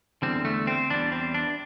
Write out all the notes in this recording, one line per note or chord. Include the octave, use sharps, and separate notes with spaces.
E2 D3 G3 C4
A3
C4
E2 E3 G3 D4
C4
D4